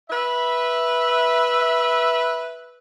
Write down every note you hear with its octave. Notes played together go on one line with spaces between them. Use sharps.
B4 E5